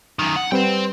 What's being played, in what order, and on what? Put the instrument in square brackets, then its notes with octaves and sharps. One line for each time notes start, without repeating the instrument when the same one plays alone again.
[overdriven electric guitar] F#2 D#3
F#5
[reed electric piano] G3 C4 B4 [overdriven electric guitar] C5 G5